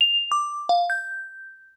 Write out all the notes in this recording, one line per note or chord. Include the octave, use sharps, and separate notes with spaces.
F7
D6
F5
G6